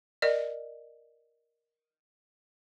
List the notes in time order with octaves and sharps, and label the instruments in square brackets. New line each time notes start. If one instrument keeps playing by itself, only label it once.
[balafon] A#4 D5 D#5